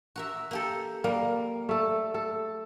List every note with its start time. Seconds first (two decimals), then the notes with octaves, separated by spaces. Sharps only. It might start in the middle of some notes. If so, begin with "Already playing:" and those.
0.16 F#4 A#4 E5
0.51 A#3 G4 A4
1.04 G3 A#3
1.69 A3 A4
2.14 A4